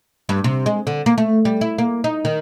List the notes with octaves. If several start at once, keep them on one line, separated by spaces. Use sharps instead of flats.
G2
C3
G#3
D3
A#3
A3
G3
E4
A#3
D#4
D#3